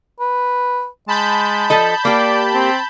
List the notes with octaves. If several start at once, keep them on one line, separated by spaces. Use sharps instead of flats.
B4
G#3 A5 B5 G6
F3 A4 D#5
A#3 G4 D5
C4